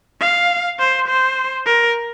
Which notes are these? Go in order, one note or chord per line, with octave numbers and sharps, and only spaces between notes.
F5
C5
C5
A#4